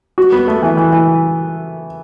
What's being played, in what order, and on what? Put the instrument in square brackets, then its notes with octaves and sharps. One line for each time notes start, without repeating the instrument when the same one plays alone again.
[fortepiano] F#4
B3
A3
E3
E3
E3